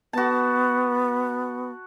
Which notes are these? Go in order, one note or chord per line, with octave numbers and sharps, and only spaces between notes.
B3 F#4 A5